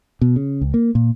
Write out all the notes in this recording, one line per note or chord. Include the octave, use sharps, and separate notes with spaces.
B2
C#3
C#2
A#3
A#2